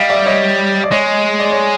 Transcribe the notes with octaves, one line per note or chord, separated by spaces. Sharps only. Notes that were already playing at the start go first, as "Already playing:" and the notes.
Already playing: G3 D#5 F5
D5 E5
C#5 D#5
D5
G#3 C#5 D#5
D5
C#5